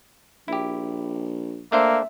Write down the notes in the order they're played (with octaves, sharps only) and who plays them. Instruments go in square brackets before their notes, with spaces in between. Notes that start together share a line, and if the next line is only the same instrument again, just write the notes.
[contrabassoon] A#1 [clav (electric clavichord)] E4 G4
[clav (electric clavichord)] A3 D4 C5 [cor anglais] A#3 [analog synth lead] E5